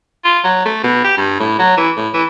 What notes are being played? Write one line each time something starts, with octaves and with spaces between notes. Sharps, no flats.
F4
F#3
A3
B2
G4
G2
A2
F#3
E3
A2
E3